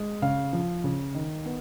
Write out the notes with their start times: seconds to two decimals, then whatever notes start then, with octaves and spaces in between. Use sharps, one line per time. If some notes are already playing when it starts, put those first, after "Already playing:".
Already playing: G#3
0.22 C#3 F5
0.53 F3
0.84 C#3
1.14 D#3
1.46 B3